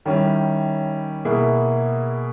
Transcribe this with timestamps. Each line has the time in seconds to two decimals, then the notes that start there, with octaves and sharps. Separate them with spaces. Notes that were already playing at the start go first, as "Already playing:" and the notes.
0.05 D#3 G3 C#4 E4
1.25 B2 A#3 E4 G#4